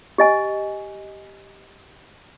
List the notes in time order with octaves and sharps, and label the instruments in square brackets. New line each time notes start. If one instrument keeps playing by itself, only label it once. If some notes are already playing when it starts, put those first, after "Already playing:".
[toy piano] G4 D#5 G#5